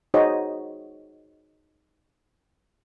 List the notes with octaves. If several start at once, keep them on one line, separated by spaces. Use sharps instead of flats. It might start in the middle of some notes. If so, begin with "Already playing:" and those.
D#4 F#4 G#4 C5 C#5 D#5